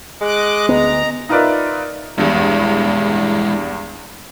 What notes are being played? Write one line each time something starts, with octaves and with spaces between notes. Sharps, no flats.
G#3 D#5 D6 F#6
D2 B3 D#5 A#5
D#4 F4 A#4 B4 D5 E5
E2 G2 G#3 E4